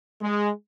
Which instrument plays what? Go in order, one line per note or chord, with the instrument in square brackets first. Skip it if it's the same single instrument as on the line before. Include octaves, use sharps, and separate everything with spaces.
[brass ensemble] G#3